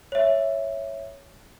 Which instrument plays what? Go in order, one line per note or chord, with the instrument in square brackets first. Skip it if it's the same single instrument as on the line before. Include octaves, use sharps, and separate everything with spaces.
[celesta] C#5 E5